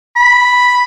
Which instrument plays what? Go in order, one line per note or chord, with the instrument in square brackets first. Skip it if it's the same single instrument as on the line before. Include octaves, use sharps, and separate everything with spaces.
[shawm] B5